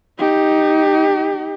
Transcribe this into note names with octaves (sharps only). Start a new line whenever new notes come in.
D#4 G4